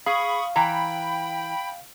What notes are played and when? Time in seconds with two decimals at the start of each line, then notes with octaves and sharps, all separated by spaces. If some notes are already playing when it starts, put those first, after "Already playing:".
0.06 G#4 F5 B5 C#6 D#6
0.56 E3 G5 A#5 B5